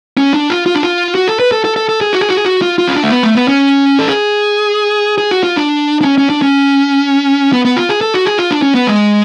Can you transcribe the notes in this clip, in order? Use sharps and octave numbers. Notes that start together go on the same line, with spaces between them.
C#4
D4
F4
F4
D4
F4
F#4
A4
B4
A4
A4
A4
A4
G#4
F#4
G#4
F#4
G#4
F#4
F4
F4
C#4
D4
A3
B3
A3
B3
C#4
A4
G#4
G#4
F#4
F4
D4
D4
C#4
C#4
D4
C#4
B3
B3
F4
G#4
A4
F#4
G#4
F4
D4
C#4
B3
G#3